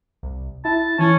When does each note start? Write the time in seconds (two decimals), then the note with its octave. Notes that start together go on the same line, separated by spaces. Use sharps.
0.23 C2
0.65 E4 A5
0.99 E3 C#4